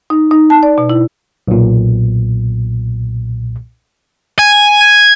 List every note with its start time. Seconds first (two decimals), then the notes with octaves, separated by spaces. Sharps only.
0.10 D#4
0.31 D#4
0.50 A5
0.63 D5
0.78 B2
0.90 E4
1.48 B1 A#2
4.39 G#5